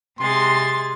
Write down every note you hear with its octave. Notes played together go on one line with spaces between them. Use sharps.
C3 G#3 C6 A6
C6